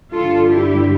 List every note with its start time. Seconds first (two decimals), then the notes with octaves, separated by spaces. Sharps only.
0.13 G2 D3 G3 F4 A4
0.51 E4 G4